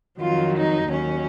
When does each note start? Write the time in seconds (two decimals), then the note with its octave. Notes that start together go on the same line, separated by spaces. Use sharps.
0.18 F2 D#3 F#3 F4
0.55 D#4
0.89 D#2 D#3 F#3 C#4